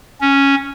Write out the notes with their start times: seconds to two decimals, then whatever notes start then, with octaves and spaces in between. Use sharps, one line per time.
0.21 C#4